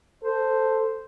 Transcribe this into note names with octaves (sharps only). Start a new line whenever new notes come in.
A4 C5